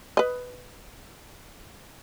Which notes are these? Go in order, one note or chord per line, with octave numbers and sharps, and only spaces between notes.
B4 D#5